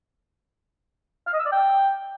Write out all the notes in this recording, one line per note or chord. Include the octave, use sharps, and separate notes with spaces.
F5
D#5
E6
D5
G5